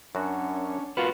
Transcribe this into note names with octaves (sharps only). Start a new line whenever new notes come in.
F#2 C#4 D4 F#4
F4 F#4 A#4 B4 F5